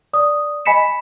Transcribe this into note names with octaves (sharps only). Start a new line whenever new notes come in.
D5 D#6
D#5 G#5 B5 B6 C#7 E7